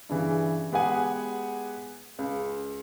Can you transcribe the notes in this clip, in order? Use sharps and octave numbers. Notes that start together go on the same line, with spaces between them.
G2 C#3 E3
G#3 B3 G4 G#4 F#5 G#5
C#2